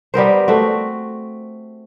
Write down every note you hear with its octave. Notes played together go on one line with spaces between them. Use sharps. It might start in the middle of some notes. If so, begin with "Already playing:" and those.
G3 B3 A#4 C5
A3 C4 F#4